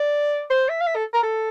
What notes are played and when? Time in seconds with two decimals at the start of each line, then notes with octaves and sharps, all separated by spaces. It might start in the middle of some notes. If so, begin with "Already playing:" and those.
Already playing: D5
0.50 C5
0.69 E5
0.81 F5
0.87 E5
0.96 A4
1.14 A#4
1.23 A4